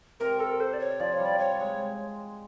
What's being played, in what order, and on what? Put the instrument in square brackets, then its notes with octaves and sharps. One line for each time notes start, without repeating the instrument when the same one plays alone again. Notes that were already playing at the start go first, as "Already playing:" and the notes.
[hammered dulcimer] C3 [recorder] A#4
[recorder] A4
C5
D5
C#5
[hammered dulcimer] F3 [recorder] D5
[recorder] C#5
[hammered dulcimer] G3
[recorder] D5
C#5
[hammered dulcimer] G#3